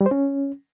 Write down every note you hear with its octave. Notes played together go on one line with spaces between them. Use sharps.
G3
C5
C#4